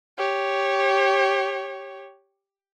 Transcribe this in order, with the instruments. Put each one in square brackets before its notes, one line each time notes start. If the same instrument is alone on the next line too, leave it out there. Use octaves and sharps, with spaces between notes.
[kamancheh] G4 C#5